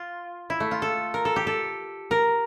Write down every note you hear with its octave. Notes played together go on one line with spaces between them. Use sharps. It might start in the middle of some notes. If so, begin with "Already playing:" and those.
Already playing: F4
E4
A3
F4
A4
A#4
A4
G4
A4
A#4